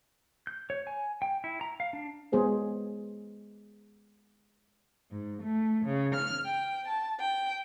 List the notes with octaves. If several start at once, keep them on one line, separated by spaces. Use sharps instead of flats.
G6
C#5
G#5
G5
E4
A#5
F5
D4
G#3 B3 G#4 C5 C#5
G#2
A3
C#3
F6
G5
A5
G5